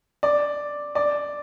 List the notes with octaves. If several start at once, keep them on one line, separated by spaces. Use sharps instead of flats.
D5
D5